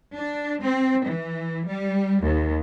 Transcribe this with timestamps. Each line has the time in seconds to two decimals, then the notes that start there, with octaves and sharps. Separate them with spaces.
0.14 D4
0.61 C4
1.05 E3
1.66 G3
2.21 D#2